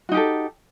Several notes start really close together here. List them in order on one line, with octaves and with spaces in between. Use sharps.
F#4 D#4 G4 A4